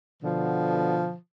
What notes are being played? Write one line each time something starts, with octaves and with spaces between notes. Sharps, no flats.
B2 D3 F3